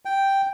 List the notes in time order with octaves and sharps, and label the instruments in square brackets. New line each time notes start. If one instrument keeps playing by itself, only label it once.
[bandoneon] G5